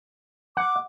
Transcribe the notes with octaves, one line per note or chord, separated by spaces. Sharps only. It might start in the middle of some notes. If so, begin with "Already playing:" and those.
F#5 D6